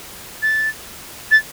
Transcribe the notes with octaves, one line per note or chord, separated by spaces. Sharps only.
A6
A6